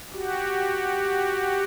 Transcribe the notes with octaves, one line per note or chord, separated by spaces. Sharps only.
F#4 G4